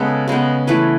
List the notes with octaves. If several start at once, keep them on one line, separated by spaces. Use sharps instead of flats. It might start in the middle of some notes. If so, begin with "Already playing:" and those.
Already playing: C#3 G#3 B3 A4 B4
C#3 G#3 B3
E3 A3 B4